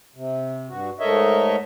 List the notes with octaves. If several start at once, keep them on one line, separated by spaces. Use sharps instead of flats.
C3
G2 F#4
G#2 A3 A#4 C#5 D#5 E5